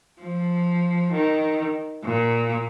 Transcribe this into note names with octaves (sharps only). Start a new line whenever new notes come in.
F3
D#3
A#2